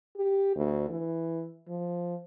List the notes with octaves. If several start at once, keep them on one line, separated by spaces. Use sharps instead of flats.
G4
D2
E3
F3